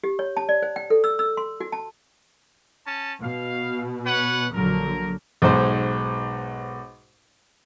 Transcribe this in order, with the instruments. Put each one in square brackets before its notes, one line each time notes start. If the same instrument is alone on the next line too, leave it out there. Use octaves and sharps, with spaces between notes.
[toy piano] G4
C#5
A5
D5
C5
G5
A4
E6
E6
C6
F#4
A5
[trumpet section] C#4 A5
[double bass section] B2 [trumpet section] F5
[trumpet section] B4 C#5 F#5
[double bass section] A#1 D3 F#3 [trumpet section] A#4
[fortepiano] B1 G#2 C5